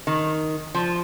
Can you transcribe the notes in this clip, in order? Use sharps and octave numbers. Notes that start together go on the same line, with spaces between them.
D#3
F3